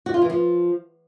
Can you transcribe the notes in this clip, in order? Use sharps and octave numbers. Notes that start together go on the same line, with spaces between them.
F#4
F4
E3
F3